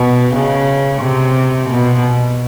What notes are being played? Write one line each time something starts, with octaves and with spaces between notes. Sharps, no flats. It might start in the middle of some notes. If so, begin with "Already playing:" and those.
Already playing: B2
C#3
C3
B2